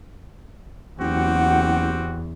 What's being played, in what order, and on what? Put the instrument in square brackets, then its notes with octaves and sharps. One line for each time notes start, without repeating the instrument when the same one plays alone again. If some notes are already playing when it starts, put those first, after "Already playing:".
[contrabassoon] F#1 [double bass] E2 [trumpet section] C4 F#4 G4 [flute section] F#5